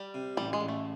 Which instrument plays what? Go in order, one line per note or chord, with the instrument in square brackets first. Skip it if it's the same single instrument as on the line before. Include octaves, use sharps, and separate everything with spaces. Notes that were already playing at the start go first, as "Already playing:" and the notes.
Already playing: [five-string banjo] G3
[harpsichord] C3
[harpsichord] A1 [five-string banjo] G3
[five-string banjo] G#3
[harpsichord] A1
[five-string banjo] A3